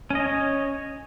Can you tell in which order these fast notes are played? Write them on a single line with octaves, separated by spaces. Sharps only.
C#4 D#5 C#5